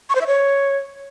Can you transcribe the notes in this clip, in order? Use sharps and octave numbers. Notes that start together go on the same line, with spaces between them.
C#6
C5
E5
C#5